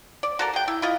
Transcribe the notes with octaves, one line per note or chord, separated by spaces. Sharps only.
D5
F#4 A4 A#4
G#4 G5
E4
E4 F4 D#5